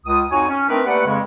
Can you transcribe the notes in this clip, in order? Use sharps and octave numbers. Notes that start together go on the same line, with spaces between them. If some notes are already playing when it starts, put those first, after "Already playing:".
C#2 D#6
F2 D#4 F#4 C#5 G#5
C#4
A3 C4 D4 D#4 A#4 B4
A3 A#3 G4 B4 D5 F#5
F2 C#3 G#3